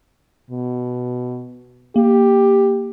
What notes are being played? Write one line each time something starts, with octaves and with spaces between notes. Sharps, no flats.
B2
A#3 G4